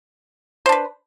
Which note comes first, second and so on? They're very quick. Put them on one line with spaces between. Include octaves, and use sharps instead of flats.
C5 D4 B4